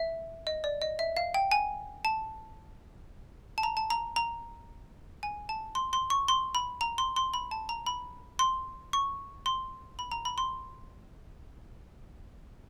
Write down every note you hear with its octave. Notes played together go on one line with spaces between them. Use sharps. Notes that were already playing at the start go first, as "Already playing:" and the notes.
Already playing: E5
D#5
D5
D#5
E5
F5
G5
G#5
A5
A5
A#5
A5
A#5
A#5
G#5
A5
C6
C6
C#6
C6
B5
A#5
C6
C6
B5
A5
A#5
B5
C6
C#6
C6
B5
A#5
B5
C6